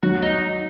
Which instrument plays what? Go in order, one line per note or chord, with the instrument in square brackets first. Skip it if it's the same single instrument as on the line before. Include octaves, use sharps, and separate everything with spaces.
[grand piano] F#3 [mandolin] F#4
[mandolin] D#4